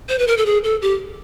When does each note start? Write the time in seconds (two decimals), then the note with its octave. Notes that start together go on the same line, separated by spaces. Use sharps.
0.09 C5
0.19 B4
0.27 A#4
0.37 A4
0.46 G#4
0.64 A4
0.82 G4